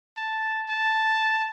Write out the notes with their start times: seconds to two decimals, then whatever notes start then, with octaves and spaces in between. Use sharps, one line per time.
0.17 A5
0.69 A5